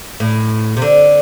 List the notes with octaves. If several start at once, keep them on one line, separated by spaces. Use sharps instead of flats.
A2
C3
D3